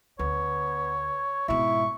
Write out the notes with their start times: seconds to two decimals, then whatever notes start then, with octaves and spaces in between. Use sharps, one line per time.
0.19 D2 B3 C#5
1.48 G#2 B2 E4 C#6